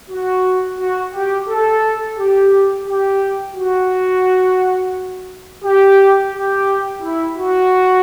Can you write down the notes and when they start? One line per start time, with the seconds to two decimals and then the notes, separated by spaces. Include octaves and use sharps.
0.11 F#4
0.79 F#4
1.14 G4
1.49 A4
2.18 G4
2.87 G4
3.56 F#4
5.64 G4
6.33 G4
7.02 E4
7.36 F#4